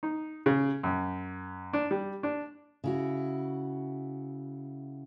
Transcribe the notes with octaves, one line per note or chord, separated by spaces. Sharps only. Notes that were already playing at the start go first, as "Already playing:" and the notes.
D#4
C#3
F#2
D4
G3
D4
C#3 E4 F#4